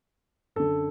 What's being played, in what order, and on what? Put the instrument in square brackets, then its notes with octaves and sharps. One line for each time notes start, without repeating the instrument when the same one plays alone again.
[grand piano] F#2 D3 A4